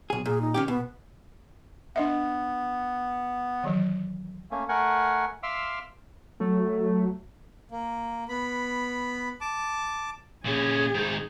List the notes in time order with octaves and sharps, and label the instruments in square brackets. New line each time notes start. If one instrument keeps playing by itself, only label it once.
[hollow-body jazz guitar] B1 G#4
[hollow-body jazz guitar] A#2 [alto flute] G#4
[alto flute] D#4
[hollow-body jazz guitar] D#3 C#4 G4
[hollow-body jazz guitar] B2 [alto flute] B3
[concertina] B3 [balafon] D4 D#5 E5
[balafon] D#3 E3 F#3
[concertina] A3 A#3 C#4
A3 A#4 F#5 G#5
E5 F5 C6 D6 E6 F6
[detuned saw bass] F#3 [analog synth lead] A3
[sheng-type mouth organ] A#3
B3 B5
A5 D6
[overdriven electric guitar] A#2 C#4 [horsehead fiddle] G#4
[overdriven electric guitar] G#2 D#3